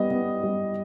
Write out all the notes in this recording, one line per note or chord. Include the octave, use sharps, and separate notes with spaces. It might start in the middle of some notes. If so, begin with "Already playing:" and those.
Already playing: G3 B3 D#5
B3
G3